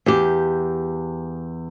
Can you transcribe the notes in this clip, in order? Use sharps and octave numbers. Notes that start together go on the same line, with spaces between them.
E2 G4